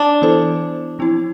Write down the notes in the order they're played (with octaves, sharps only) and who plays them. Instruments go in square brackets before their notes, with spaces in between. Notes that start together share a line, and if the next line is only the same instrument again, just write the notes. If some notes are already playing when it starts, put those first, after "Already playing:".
Already playing: [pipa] D4
[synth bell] E3 B3 E4 A4 C5
F3 C4 E4